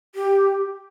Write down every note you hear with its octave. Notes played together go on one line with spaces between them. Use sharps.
G4